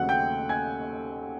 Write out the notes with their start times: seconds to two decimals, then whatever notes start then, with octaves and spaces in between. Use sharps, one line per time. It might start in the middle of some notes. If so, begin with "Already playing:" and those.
Already playing: D#2 C#3 F#3 A3 C4 F#5 F#6
0.09 G5 G6
0.49 G#5 G#6